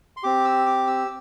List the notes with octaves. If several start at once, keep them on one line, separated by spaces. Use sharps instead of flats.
C6
C4 G4 D6
E6
D6
E6